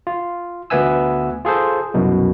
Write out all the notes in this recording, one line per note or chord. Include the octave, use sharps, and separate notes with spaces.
F4
D2 B3 B4 E5 G#5 E6
F4 G#4 A4 C5
C2 F#2 B2